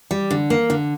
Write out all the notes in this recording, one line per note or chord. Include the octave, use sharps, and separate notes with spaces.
G3
D3
A#3
D3